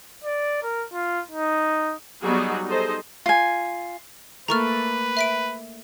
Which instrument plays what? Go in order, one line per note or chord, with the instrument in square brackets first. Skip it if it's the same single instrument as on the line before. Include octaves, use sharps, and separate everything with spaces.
[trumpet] D5
A#4
F4
D#4
[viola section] F#3 G3 B3 D#4 F#4 G#4
D#4 G#4 A4 C5 D#5
[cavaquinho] F4 G#5
[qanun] A3 A#3 A4 [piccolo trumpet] B4 [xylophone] A#5 C#6 F6
[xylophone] E5 B6 D7